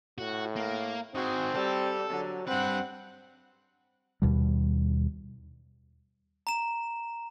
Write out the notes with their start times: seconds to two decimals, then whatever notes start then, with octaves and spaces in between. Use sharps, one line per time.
0.18 A2 F#4
0.56 A#3 A#4
1.15 D#3 C4 F#4 G#4
1.54 G3 A4
2.10 D3 F#3
2.47 G2 C4 B4 F#5
4.22 D#2 B2 G3
6.47 A#5 E7